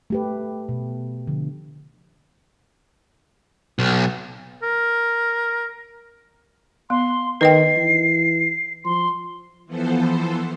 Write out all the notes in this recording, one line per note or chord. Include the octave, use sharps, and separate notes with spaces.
A3 G4 B4
B2
D3 F3
B1
A#4
B3 C6
D#3 B4 D#5 G5 C7
E3
F3 C6
E3 F3 B3 A4 C5